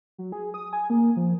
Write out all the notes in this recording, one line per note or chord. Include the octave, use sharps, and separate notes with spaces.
F#3
G#4
D#6
G#5
A#3
F3